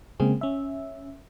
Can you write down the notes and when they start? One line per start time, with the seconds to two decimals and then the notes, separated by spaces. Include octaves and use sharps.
0.20 C#3 G#3 A#3 C4 G#4
0.41 C#4 E5